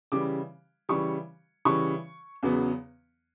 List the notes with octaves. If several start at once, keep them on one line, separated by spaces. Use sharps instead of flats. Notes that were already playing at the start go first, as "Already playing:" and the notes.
C#3 E3 G3 D6
C#3 E3 G3 C#6
C#3 E3 G3 C#6
E2 C#3 F#3 B3